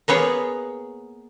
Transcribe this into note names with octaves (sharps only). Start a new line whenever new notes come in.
A#3 B3 G#4 C#5